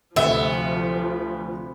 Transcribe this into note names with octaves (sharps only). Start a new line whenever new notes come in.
D2 C3 F3 B3 E5 G7